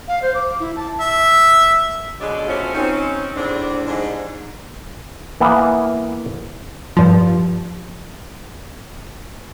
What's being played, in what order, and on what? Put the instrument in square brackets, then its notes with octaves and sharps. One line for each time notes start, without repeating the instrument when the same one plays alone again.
[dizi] F5
C5
D6
E4
A5
[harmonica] E5
[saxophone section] D2 B2 F#3 G#3 D5
B2 A3 C4 C#4 F4 F#4
C4 C#4 D#4
E2 A2 C4 D4
G#2 C3 D4
[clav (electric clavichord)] E3 A#3 B3
[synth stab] G2 F3